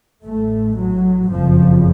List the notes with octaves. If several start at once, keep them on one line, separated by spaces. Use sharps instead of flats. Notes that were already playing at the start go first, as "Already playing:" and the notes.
A1 A2 A3
F#3
F#1 F2 C#3 F3